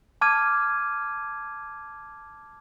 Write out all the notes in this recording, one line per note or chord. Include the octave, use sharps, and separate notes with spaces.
A5 D6 F6 G#6 D#7